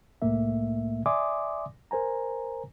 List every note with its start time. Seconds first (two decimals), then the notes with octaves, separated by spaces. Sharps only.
0.22 C2 A2 A3 A#3 E5
1.06 D5 E5 G#5 C6 D6 D#6
1.91 A#4 C5 G#5 A#5